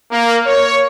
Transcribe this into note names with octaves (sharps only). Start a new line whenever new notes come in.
A#3
C#5